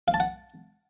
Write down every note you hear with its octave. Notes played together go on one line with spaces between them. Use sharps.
F5
A5
F#5